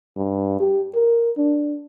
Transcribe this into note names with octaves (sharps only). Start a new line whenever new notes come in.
G2
G4
A#4
D4